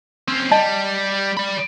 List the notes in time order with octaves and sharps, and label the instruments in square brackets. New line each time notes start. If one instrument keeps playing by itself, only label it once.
[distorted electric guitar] C4 C#4
[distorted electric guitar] G3 [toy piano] D#5 A5
[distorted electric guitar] D5 B5